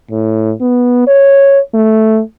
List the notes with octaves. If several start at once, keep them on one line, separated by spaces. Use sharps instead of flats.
A2
B3
C#5
A3